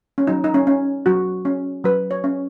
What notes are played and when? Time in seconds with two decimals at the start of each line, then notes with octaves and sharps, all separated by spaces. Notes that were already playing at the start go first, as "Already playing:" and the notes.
0.18 C#4
0.27 F#3 D#4
0.44 D#4
0.54 C#4
0.67 C#4
1.06 F#3 F#4
1.45 C#4
1.84 F#3 B4
2.11 C#5
2.24 C#4